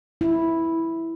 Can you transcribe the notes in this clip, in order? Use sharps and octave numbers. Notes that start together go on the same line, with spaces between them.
E4